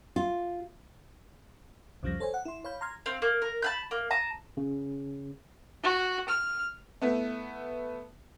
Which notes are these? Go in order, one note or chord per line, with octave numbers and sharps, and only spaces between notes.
F4
C2 F2 C#3 F3 G3 A#6
A4 C5 C#5 G#5
F#5
E4 C6
C#5 F5 B5 G6
A#5 C6 F6 G#6
C4 F5
A#3
A#4
A5 B5 G6
A#3
A5 A#5 D#6
C#3
F#4
F6
A3 B3 E4